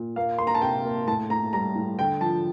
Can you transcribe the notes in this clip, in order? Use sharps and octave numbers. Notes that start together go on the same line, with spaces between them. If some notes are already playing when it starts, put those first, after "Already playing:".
Already playing: A#2
A#3 F5
A#3 C6
A#5
A5
C3 G5
A#3
A2 A5
A2 A#5
G3 A#5
A2
D3 G5
F3 A5